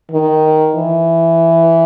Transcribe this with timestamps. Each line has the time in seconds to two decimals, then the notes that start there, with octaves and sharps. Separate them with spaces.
0.11 D#3
0.76 E3